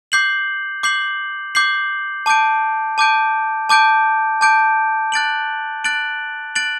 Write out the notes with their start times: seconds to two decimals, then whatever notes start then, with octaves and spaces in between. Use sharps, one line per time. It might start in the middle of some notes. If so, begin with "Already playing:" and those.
0.12 D6 G6 C7 F#7
0.83 D6 G6 C7 F#7
1.55 D6 G6 C7 F#7
2.26 A5 D6 G6 D7
2.98 A5 D6 G6 D7
3.69 A5 D6 G6 D7
4.41 A5 D6 G6 D7
5.12 F#6 A6 D7 F#7
5.84 F#6 A6 D7 F#7
6.56 F#6 A6 D7 F#7